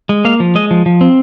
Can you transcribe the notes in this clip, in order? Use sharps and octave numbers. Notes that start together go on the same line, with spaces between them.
G#3
A#3 F5
F3
G#3 D#5
F3
F3
C4